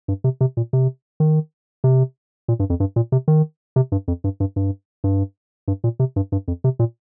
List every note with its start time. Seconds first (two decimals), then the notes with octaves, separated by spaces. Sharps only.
0.08 G2
0.24 C3
0.41 C3
0.57 A#2
0.73 C3
1.20 D#3
1.84 C3
2.48 A#2
2.59 G2
2.70 F2
2.80 G2
2.96 A#2
3.12 C3
3.28 D#3
3.76 C3
3.92 G2
4.08 F2
4.24 G2
4.40 G2
4.56 G2
5.04 G2
5.68 G2
5.84 A#2
5.99 C3
6.16 G2
6.32 G2
6.48 F2
6.64 C3
6.79 A#2